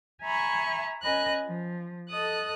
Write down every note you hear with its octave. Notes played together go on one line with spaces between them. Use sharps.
E5 G#5 A#5 B5 C#6
C#4 A#4 D#5 G#5 B5 F#6
F3
A4 D#5 D#6 F#6